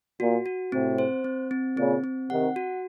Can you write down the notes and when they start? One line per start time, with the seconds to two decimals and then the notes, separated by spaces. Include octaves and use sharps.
0.20 A#2 F#4
0.46 F#4
0.72 A2 C3 C4
0.98 C5
1.24 C4
1.51 C4
1.77 A#2 C#3 C4
2.04 C4
2.30 C3 D#3 F#5
2.56 F#4